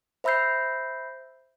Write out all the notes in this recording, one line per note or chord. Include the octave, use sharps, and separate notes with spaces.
C5 E5 B5 E6 G6 C7